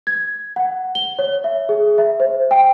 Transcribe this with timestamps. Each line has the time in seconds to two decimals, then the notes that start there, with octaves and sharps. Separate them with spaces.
0.07 G#6
0.56 F#5
0.95 G7
1.19 C#5
1.44 E5
1.69 G#4
1.98 E5
2.20 C5
2.51 G5